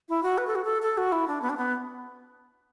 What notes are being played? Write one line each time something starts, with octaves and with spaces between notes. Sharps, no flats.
E4
F#4
B4
A4
F#4
A4
A4
F#4
E4
D4
B3
D4
B3